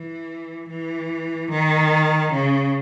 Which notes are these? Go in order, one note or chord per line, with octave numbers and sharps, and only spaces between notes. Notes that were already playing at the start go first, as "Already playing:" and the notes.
Already playing: E3
E3
D#3
C#3